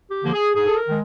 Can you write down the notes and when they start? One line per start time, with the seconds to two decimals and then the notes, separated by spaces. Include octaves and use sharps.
0.11 G4
0.22 D3 F3 A#3
0.33 G#4
0.55 G#2 G#4
0.66 A4
0.77 A#4
0.87 D#3 G#3